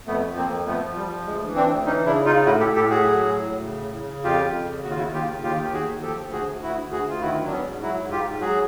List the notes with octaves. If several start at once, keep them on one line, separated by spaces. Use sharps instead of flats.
F2 A3 B3
F3
A#3 C4
F2
F3 A3 B3
F3
G3
F3
D2 G#3
E3
C4 D4
D2
E3 C#4 D#4
C#3 D4 E4
C#3 D#4 F4
A2 E4 F#4
G4 A4
A2
G4 A4
A2 F#4 G#4
F#3
A2
A2
C#3
C#3
C#3
F2 F4 G4
F2
C#3
D#2 F#4
F4
E4 F#4
D#2
F4 G4
C#3
D#2 F4 G4
D#2 G4
F#4 G#4
D#2
F3 G4 A4
D2
F#4 G#4
D2
D2 E4 F#4
D2
F#4 G#4
D2
F4
D#3 E4 F#4
F#3 D4
B3 C#4
G#2
F#3 E4 F#4
G#2
F4 G4
G#2
F#3 F#4 G#4